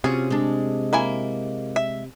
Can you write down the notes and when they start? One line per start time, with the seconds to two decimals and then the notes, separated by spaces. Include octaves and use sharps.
0.04 C3 C#4 F4 F#4 G#4
0.30 G#3 D4
0.93 A#3 E4 G#5
1.76 E5